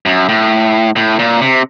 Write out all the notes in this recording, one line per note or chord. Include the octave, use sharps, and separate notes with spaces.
F#2
A2
A2
A#2
C3